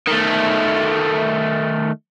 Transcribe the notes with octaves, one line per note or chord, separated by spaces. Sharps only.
D#3 A3